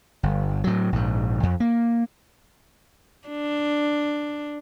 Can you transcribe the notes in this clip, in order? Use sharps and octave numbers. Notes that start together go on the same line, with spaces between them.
G1
A2 F#3
A#1 G#2
F2
A#3
D4